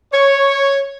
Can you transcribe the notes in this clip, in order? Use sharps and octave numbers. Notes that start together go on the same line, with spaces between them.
C#5